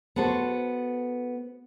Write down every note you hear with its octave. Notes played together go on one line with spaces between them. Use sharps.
B3 F#4 A4 C5